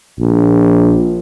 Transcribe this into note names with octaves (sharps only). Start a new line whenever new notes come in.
A#1